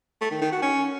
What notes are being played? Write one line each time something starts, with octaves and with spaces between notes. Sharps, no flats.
A3
D#3
D#3
F#4
C#4